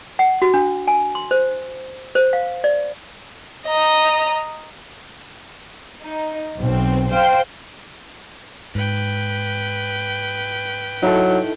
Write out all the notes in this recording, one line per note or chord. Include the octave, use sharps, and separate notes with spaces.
F#5
F#4
D4
G#5
C6
C5
C5
F5
D5
D#5 A#5
D#4
B1 C4
C5 F5 G5
G#2 B4 G5
F#3 D#4 E4 A4